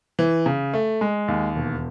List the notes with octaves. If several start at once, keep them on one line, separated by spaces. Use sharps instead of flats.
E3
C#3
A3
G#3
D#2
E1